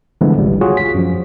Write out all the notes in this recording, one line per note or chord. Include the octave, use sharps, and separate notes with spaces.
D3 E3 F3 G#3 A3 B3
G#1 C#2 G3
F4 F#4 G#4 C#5
B6
F#2 F3